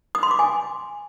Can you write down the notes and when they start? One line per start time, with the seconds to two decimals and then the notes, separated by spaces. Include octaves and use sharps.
0.15 D#6
0.23 C6
0.31 D6
0.39 G#5